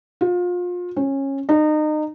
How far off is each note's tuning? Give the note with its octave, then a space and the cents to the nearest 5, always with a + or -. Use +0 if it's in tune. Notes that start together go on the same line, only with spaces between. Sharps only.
F4 +30
C#4 -20
D#4 -30